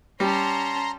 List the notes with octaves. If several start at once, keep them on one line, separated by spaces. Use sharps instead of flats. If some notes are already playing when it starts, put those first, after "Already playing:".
G3 C#4 A5 A#5 C6